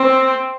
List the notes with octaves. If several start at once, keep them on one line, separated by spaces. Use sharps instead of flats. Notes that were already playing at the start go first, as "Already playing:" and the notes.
Already playing: C4